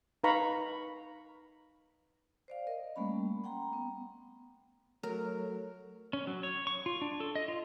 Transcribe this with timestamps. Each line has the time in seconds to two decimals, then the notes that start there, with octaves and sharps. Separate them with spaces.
0.24 D#4 B4 F5 A#5 B5 C#6
2.48 C5 D5 F5
2.67 A#4 D#5
2.96 G3 A3 A#3 C#4 B5
3.44 F#5 G5 A#5 C6
3.73 B3
5.03 F#3 A3 A#4
6.13 C#4
6.27 F#3
6.43 C#5
6.67 C#6
6.86 F4
7.02 D4
7.20 A4
7.35 D#5
7.48 F4